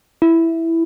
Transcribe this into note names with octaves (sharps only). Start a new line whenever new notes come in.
E4